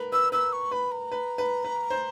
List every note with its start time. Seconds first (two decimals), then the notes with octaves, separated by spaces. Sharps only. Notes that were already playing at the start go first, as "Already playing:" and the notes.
Already playing: A#4 B4
0.12 B4 E6
0.32 B4 E6
0.53 C#6
0.71 B4 B5
0.92 A#5
1.12 B4
1.38 B4
1.65 B4
1.90 C5